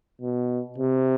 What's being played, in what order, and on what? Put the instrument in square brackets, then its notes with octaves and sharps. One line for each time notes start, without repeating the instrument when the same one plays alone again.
[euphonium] B2
C3